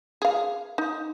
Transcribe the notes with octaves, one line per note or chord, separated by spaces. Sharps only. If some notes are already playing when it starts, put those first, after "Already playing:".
G#4 F5
D#4